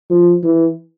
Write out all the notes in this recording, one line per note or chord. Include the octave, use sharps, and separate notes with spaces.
F3
E3